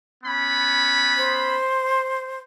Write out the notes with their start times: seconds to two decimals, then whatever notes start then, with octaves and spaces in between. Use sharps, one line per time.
0.24 B3 C#4 B5
1.17 C5